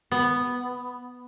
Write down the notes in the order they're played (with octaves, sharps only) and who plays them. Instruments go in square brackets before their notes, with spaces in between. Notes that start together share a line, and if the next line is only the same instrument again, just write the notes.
[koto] B3